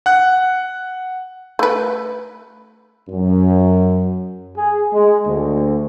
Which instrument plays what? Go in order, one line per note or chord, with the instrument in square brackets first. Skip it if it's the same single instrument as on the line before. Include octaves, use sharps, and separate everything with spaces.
[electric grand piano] F#5 F#6
[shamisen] A3 B4
[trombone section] F#2
G#4
G#3
D2